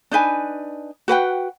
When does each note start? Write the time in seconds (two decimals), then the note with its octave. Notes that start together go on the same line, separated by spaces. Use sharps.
0.11 D4 D#4 B4 G#5
1.08 F#4 B4 F#5 G5